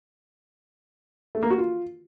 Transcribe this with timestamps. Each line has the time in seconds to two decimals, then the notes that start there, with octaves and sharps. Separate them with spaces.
1.35 A3
1.43 A#3
1.50 F#4
1.58 F4